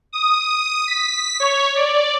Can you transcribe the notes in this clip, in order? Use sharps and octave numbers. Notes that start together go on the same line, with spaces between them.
D#6
B6
C#5
D5